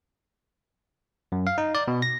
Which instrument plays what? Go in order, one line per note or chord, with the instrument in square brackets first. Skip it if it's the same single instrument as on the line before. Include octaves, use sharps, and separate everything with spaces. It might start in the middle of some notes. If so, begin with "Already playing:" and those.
[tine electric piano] F#2
F5
D#4
D5
B2
A#6